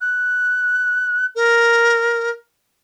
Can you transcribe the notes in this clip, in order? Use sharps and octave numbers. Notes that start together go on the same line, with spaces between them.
F#6
A#4